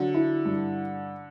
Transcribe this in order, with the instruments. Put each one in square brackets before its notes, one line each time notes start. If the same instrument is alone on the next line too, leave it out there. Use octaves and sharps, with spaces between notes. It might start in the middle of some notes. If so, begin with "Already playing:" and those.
Already playing: [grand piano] D3 [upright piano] F#3
[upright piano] E4
G2